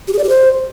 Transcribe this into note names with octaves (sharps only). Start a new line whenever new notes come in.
G4
G#4
D5
G4
C5